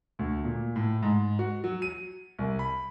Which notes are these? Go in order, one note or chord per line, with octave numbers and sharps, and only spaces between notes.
D2
A#2
A2
G#2
F#4
F#3
D#7
C2
B5